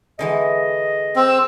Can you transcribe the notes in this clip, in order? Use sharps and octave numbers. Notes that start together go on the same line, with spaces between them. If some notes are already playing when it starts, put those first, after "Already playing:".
D3 E3 G#3 D#5
C4 E6